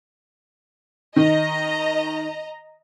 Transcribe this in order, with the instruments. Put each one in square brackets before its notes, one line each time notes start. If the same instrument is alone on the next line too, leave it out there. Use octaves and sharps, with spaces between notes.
[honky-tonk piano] D#3 [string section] D#5 A#5